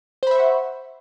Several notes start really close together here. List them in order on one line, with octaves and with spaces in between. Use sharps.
C5 B5 E5 C#6 F#5